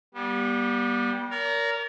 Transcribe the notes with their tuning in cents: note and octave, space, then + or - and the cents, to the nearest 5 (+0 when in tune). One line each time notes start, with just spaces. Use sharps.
G3 +0 B3 -35
A#4 +0 D5 -45 A#5 +0